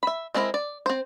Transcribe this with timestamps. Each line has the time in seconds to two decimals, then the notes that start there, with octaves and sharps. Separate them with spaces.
0.03 E5 B5
0.35 G#3 C4 D4 E4 A#4
0.54 D5
0.86 C4 C5